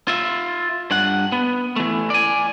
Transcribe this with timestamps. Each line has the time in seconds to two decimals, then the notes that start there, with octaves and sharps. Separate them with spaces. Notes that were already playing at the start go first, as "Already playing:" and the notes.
0.08 F4 E5
0.91 G2 F#5
1.32 B3
1.76 E3 A3
2.10 D5 G#5